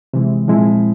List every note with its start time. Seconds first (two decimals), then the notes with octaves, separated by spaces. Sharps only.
0.13 C3 E3 G#3
0.48 A#2 F3 G#3 C4 E4